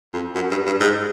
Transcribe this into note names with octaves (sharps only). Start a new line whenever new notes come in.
F2
F#2
G2
G2
G#2